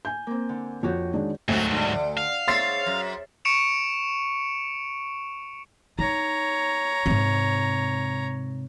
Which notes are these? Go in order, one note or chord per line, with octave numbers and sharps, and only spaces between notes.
G#5 G6
A#3 C4
D3
F2 F#4 G4 C#5
D#3 G#3 D4
D2 G#2 F#3 C4 F#4
D3
F5
G#2 C#5 E5 C6 A6 C7
F#2
C#6 C#7 D7 E7 F7
D#4 C#5 A#5
G#2 C3